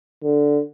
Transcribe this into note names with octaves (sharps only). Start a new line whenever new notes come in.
D3